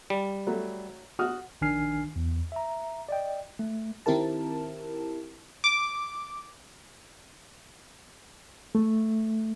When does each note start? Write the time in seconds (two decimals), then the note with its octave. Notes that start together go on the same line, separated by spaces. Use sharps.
0.10 G3
0.47 F#3 A3
1.19 F#4 D#6 F6
1.61 A#1 D#3 D4 G#5 F6 C7
2.16 E2
2.52 E5 A#5
3.09 D5 D#5 G5
3.59 A3
4.06 D#3 C4 E4 G4 A#4 A5
5.64 D6
8.75 A3